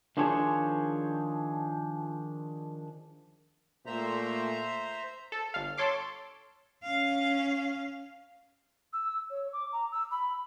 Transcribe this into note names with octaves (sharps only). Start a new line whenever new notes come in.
D#3 F3 D4 G#4 C5 C#5
A#2 A3 C5 E5 A#5
A4
G1 F5
A4 C#5 C6 D6
C#4 F5
E6
C#5
D6
A#5
E6
B5